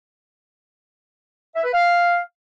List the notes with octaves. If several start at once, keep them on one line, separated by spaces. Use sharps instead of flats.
E5
B4
F5